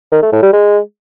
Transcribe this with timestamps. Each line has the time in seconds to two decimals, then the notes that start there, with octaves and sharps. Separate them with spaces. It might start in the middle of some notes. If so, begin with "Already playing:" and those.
0.12 D#3
0.22 A3
0.32 A2
0.43 G3
0.53 G#3